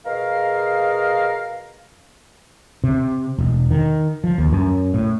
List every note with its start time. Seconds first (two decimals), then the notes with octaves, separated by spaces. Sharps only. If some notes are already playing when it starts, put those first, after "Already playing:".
0.06 B2 G#4 A#4 F5
2.84 C3
3.38 E1
3.71 D#3
4.24 F3
4.38 D#2
4.52 F#2
4.94 A2